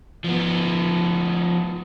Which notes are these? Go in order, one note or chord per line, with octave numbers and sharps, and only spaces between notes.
F3 B3